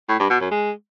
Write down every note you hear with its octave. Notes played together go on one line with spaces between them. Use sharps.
A2
G2
B2
F#2
G#3